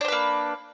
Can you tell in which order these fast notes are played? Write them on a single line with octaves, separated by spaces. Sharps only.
D4 C5 B4 A#3